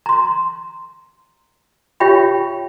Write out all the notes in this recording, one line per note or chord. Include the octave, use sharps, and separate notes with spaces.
A#5 C6
F4 G4 C#5 E5 G5 B5